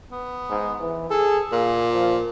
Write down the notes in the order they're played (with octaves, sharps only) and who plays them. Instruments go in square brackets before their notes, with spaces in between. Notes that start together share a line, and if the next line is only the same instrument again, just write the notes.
[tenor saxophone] B3
[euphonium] G#2
E3
[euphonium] G#4 [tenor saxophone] A4
[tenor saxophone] A#2 [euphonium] A#3
[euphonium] F3